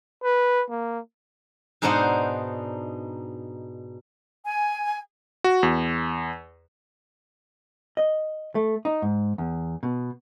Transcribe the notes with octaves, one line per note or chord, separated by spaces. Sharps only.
B4
A#3
G#2 B2 D4 D#4 C5 F#5
G#5
F#4
E2
D#5
A3
D#4
G#2
E2
B2